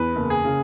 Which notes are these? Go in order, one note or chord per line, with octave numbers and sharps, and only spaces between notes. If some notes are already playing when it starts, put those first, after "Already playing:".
Already playing: E2 B4
F#1
G#4
C#3